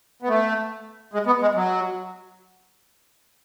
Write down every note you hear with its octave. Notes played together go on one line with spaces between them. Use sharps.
B3
A3
G#3
B3
G#3
F#3